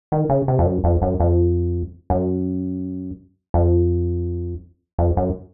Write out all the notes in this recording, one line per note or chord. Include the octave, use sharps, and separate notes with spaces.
D#3
C#3
C3
F2
F#2
F2
F#2
F2
F#2
F2
F2
F#2